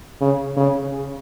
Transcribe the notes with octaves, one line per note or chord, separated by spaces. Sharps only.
C#3
C#3